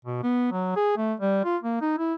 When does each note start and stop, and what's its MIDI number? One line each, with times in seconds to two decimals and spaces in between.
0.05 0.21 47
0.23 0.51 59
0.52 0.72 54
0.76 0.93 68
0.97 1.14 57
1.20 1.40 55
1.45 1.57 65
1.63 1.78 58
1.82 1.96 63
1.98 2.14 64